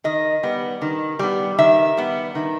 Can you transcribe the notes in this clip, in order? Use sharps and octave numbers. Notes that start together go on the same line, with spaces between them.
D#3 D#5
G3 B3
D#3
G3 B3
D#3 E5
G3 B3
D#3